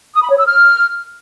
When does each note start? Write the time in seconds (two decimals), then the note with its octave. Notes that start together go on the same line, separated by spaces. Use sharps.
0.14 D#6
0.22 B5
0.31 C#5
0.39 E6
0.47 F6